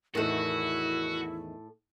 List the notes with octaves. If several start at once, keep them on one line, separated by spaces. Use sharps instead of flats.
E2 A2 D#3 E4 F#4 A4